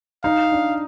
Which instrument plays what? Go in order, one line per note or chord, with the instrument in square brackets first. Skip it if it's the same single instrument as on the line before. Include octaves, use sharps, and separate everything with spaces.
[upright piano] D#4 [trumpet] F5
[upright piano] D4